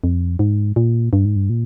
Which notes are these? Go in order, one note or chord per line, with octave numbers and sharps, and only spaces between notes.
F2
G#2
A#2
G2
G#2
G2
A#2